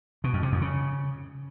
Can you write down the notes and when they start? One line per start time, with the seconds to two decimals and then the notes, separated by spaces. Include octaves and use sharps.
0.24 B2
0.33 F2
0.43 C3
0.52 F2
0.62 C#3